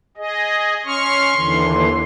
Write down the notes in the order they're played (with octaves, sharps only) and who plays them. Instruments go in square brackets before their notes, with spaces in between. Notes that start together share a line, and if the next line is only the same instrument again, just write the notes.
[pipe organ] G#4 D#5
[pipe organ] C#4 C#6 F6 [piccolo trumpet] C6
[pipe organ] D#2 D3 E3